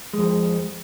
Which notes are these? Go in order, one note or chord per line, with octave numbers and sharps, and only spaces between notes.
F2 G#3